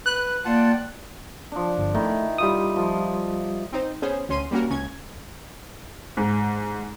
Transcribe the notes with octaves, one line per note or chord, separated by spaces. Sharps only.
B4 F#6
A#3 F4 D5 F#5 G5 A5
F3 D4
G1
D#3 A3 E4
G3 F4 D#6
F3
C4 D#4 C5
B3 C#4 G#4 C5 C#5
D2 C#4 C6 D#7
G3 A#3 C#4 F#4 A#4
C#2 C#4 G#6
G#2